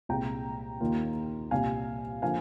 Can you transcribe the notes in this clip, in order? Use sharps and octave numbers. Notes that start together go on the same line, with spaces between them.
C2 A#2 G#3 G5 A#5
D#2 D#3 A#3 F4
C2 A#2 G3 F5 G#5
D3 F3 A#3 F4 F5 G#5